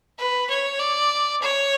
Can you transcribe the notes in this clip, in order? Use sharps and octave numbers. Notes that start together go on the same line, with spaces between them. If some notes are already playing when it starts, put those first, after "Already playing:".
B4
C#5
D5
C#5